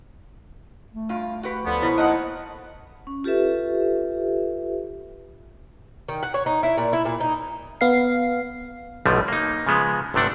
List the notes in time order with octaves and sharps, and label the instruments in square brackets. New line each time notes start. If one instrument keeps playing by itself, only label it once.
[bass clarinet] A3
[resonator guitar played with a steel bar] G2 F4
F#4 G4 B4
[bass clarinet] D2 [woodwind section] D3 F3 B3
[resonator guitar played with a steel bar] B2 C#5 [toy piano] E4 [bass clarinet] C5
[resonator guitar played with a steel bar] F2 A#3 D#5 [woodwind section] D#4 F#5 [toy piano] A5
[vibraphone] C#4
F4 G4 A4 B4 E5
[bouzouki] D#3
F#5
C#5
D#4
E4
A#2
E4
A#2
D#4
[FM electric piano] B3 F5 C7
[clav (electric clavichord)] B1 B2 D3 F3 G3 A3
A#3 D#4
C#3 F3 G#3 B3
G1 C3 A3 D4 F#5